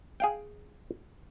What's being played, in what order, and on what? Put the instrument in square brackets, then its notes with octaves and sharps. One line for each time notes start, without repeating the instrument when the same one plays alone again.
[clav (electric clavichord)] G#4 F5 G5